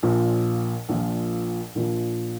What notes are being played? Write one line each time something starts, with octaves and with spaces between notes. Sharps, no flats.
A#1 A#2 F3
A#1 A#2 F3
A#1 A#2 F3